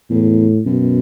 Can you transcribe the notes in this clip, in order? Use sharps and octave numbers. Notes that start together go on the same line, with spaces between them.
E2 A2
F#2 B2